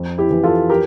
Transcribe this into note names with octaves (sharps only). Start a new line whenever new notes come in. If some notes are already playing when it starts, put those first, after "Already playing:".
Already playing: F2
E4 G4
E3
F4 A4
G4 A#4